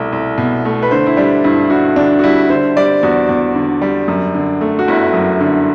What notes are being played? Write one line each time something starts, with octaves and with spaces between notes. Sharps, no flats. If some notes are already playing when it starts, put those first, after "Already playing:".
Already playing: C2 B2 A3
C2
B2
A3
B4
D3 C5
E4
G3 D4
G2 E4
G2 F#4
D3 D4
F#4
G3 E4
D3 C5
G3 D5
E2 F#4
E2
D3
G3
F#2
D3
A3
F#4
G1 E4
F#2
D3